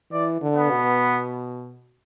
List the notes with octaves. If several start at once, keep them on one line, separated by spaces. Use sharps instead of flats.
E3 D5
D3
B3
B2